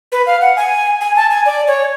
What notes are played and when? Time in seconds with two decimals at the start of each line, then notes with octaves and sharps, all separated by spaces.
0.12 B4
0.26 F5
0.41 F#5
0.56 G#5
1.01 G#5
1.16 A5
1.30 G#5
1.46 D5
1.67 C#5